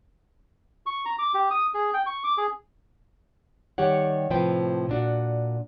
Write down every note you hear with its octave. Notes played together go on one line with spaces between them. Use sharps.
C#6
A#5
D6
G4
D#6
G#4
G5
C#6
D6
G#4
D#3 G3 G4 C#5 F#5
A2 C3 F3 B4 C5 G5
A#2 D4 F#4